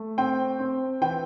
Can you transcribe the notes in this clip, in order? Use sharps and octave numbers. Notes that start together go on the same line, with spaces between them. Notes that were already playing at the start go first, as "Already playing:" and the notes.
Already playing: A3
C4 G5
C4
E3 G5